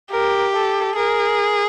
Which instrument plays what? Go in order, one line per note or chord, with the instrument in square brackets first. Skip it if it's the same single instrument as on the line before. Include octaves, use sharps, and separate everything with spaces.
[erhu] G4 [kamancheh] A#4
[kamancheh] A4
[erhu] G#4 [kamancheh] A#4